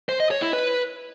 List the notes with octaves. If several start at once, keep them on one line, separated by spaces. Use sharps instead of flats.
C5
D#5
C#5
E4
B4